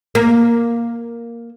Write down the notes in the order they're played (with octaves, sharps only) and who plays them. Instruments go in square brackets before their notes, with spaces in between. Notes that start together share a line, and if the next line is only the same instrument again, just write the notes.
[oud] A#3